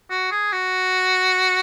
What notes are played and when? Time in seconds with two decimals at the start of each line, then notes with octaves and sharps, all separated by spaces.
0.10 F#4
0.31 G#4
0.53 F#4